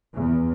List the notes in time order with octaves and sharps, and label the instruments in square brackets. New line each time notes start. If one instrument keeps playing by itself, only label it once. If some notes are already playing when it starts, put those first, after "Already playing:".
[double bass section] E2